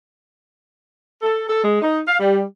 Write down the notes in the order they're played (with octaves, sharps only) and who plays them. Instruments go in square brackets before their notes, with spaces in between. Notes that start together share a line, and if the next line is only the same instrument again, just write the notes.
[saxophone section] A4
A4
G#3
D#4
F5
G3